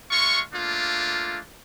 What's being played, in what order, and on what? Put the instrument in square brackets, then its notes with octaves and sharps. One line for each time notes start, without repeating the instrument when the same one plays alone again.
[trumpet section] G#3 F4 C#6
A3 A#3 D4 F4